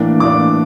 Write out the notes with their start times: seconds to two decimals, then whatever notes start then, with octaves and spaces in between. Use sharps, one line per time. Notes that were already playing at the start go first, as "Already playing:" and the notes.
Already playing: A2 E3 A#3 D4
0.20 A2 E3 A#3 D4 D6